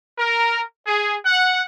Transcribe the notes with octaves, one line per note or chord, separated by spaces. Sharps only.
A#4
G#4
F#5